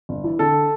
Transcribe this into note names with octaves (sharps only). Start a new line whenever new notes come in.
G1
E3
D3 A4